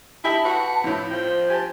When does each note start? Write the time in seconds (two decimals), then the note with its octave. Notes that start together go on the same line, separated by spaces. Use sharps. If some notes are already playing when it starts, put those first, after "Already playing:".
0.24 D#4 E4 G4 A5
0.45 F#4 B4
0.84 F2 A2 E4
1.11 F3 C5 G5
1.50 G4 G#5 A5